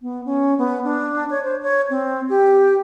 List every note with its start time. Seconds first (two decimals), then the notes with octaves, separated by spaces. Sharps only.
0.02 B3
0.25 C#4
0.58 B3
0.84 D4
1.30 C#5
1.43 C5
1.62 C#5
1.90 C4
2.29 G4